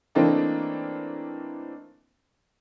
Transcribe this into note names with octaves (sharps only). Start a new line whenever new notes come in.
E3 A3 A#3 C4 D4 D#4